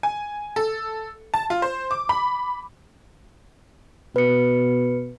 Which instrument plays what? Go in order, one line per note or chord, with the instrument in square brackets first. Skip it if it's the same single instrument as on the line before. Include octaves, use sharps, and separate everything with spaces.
[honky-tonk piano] G#5
A4
A5
F4
C5
D6
B5
[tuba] B2 [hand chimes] B4 C#7